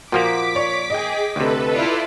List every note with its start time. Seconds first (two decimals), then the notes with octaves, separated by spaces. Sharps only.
0.12 A#2 F3 A#3 F#4 D6 B6
0.55 C#5 D5
0.90 G#4 D#5 G5
1.36 D2 C3 A4 B4
1.74 E4 F4 D5